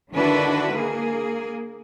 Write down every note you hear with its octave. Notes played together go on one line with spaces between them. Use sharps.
D3 D#3 D4 E4 F#4 B4
A#3 G#4